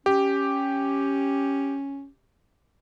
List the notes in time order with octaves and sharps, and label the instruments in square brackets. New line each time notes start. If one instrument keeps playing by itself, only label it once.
[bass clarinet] C#4 [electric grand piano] G4